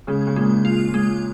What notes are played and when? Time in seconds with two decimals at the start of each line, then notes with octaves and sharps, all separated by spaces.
0.07 C#3 G#3
0.27 C#3
0.36 A#2 G#3
0.65 F4
0.94 G#3